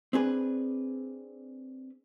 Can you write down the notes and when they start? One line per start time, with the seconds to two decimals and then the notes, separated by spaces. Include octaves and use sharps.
0.13 C4 D4 G#4 B4